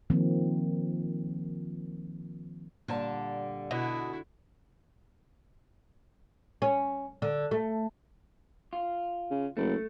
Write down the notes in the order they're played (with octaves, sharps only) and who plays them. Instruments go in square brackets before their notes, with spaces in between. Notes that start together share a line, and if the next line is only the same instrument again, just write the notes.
[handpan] D#3 F3 A#3 C4
[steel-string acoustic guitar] A#2 G3 A5 [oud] D3
[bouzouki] B2 [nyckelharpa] E4 F#4
[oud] C#4
D3
A3
[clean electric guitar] F4
[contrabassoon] C#3
[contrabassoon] F#1 [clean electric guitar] A3